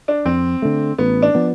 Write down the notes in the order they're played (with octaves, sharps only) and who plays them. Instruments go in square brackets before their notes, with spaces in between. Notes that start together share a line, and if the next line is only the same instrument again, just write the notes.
[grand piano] D4
[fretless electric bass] F2 [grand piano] C4
[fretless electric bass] D3 A3
[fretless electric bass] A1 [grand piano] B3
[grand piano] D4
[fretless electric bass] F3 B3